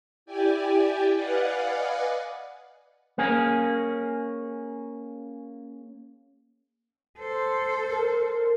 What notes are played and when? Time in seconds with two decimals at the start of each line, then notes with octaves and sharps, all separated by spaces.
0.26 E4 G4 D5 G5 G#5
1.15 B4 D5 D#5 F5 F#5 G#5
3.18 A#3 C#4 G#4
7.19 A4 C5
7.90 A#4